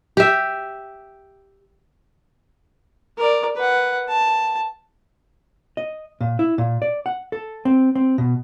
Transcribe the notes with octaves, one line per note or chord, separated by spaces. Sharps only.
G4 E5
A#4 D5
B4 F#5
A5
D#5
A#2
E4
A#2
D5
F#5
A4
C4
C4
B2